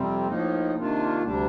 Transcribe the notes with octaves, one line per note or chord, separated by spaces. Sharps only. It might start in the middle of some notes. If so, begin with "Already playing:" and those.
Already playing: F2 C3 G3 C4
A2 F3 A#3 D#4
C3 D#3 A#3 D4 F4
D2 C3 G3 D4